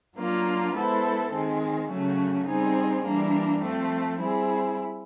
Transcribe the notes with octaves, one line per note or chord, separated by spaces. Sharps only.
F#3 A#3 D4 F4
G#3 B3 E4 A4 C5
D#3 G#3 C4
C#3 F#3 A3 C#4 F#4
G3 C4 D#4 G#4
E3 G3 A#3 D4
F3 A3 C4
G3 C4 E4 G#4